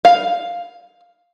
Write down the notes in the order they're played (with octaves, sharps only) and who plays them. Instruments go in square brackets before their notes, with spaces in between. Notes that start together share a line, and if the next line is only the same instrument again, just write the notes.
[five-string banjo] F5